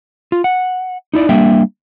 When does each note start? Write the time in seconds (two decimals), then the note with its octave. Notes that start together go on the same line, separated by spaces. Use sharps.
0.32 F4
0.44 F#5
1.14 D#4 E4 D5
1.29 G3 A#3 D4 E5 G5